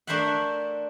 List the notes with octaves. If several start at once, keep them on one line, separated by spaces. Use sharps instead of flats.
A3 D4 A#4 C5 E5 F#5